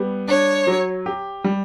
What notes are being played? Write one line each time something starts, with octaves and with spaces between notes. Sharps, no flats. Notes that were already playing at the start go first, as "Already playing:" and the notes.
Already playing: G3 B3
D4 C#5
F#3
G4
G3